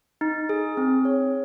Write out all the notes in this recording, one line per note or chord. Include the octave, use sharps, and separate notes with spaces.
D#4
G#4
C4
C#5